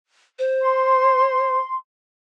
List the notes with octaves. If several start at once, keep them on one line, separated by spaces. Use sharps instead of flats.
C5
C6